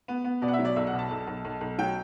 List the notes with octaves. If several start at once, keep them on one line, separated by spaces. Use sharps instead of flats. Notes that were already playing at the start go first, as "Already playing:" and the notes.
B3
B3
B2 D5
F#5
E5
F#3
D5
B1 E5
F#5
B2
A5
B1
B1
B1
B1
F#3 G5